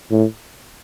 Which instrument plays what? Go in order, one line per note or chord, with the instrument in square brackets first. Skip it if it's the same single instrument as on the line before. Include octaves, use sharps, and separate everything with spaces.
[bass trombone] A2